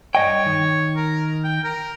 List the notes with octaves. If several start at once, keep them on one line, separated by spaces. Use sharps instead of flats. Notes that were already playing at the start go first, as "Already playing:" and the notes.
G2 C#5 D#5 G5
D#3
A#4
G5
A#4